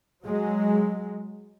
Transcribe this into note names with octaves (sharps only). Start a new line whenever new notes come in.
F#3 G#3